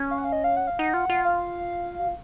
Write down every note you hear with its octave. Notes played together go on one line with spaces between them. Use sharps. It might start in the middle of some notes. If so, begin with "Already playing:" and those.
Already playing: C#4
F5
F#5
F5
D#5
F5
F#5
F5
D#4 F#5
F4
F4
F5
F#4
F4